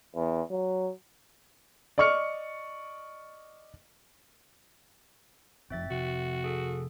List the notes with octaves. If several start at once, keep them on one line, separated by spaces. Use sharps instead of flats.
E2
F#3
D5 D#5 C#6 F6 C#7
F#1 F2 F3 C4 E5 A6
C3 F3 F#4
G#4 A4